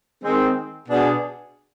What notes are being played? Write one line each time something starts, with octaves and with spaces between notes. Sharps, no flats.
D#3 G#3 C4
B2 B3 D4 G#4